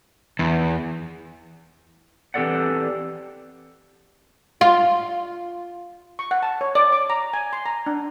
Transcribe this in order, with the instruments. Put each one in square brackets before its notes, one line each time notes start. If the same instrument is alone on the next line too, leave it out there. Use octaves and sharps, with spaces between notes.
[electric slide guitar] E2
E3 C4 G4 A4 D5 F#5
[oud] F4
[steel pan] C#6
F#5
A5
C#5
D5
D6
A#5
G#5
C6
A#5
D4